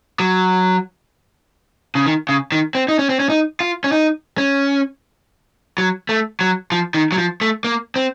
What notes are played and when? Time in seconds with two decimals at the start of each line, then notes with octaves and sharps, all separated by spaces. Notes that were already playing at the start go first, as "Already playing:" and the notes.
0.20 F#3
1.95 C#3
2.06 D#3
2.29 C#3
2.52 D#3
2.75 C4
2.88 D#4
2.99 C#4
3.09 C4
3.20 C#4
3.29 D#4
3.60 F4
3.84 C#4
3.92 D#4
4.38 C#4
5.78 F#3
6.09 A3
6.41 F#3
6.72 F3
6.94 D#3
7.12 F#3
7.18 F3
7.41 A3
7.64 A#3
7.96 C4